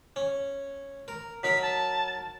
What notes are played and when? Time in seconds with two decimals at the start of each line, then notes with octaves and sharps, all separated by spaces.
0.16 C#4
1.08 A#4
1.43 F#3 D#4 A#4 B6
1.62 A5